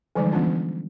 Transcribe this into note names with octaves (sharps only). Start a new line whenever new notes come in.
D3 E3 F3 G3 G#3 D#4
E3 B3 C#4 D4 F4